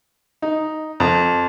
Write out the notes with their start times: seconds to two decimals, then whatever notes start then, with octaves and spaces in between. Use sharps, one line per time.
0.42 D#4
1.00 F2